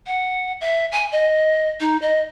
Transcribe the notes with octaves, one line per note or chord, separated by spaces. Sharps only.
F#5
E5
G#5
D#5
D#4
D#5